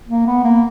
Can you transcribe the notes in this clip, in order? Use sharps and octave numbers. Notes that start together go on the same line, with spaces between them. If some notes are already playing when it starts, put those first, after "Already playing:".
A#3
B3
A#3